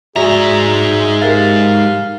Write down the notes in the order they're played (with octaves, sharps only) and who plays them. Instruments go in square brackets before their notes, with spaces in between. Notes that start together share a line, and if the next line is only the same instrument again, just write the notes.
[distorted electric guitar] G#2 A#5 [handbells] F#4 D5 B6 [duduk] G#4 [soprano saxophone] E5
[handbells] G4 A#4 A6 [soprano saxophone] F5